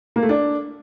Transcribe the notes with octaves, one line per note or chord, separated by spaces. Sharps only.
A#3
A3
D4